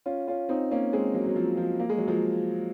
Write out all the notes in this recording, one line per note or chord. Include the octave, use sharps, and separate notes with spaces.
C#4 F4
C#4 F4
C4 D#4
A#3 C#4
G#3 C4
F#3 A#3
F#3
F3
F3
A#3
G#3
F#3
F3 G#3